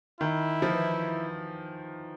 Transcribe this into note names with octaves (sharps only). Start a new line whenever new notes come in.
D#3 E4
F3
E3